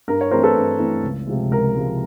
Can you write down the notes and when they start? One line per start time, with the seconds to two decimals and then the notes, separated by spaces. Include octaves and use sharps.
0.08 G2 A#4
0.21 C#5
0.31 E3 A3 C4 E4 A#4 C5
0.43 A4 B4
0.55 G2
0.79 E3 A3 C4 E4
1.03 C#2
1.27 C3 F3 G#3
1.51 C#2 A#4
1.75 C3 F3 G#3